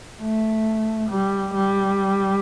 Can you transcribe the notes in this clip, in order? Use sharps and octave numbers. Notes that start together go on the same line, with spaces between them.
A3
G3
G3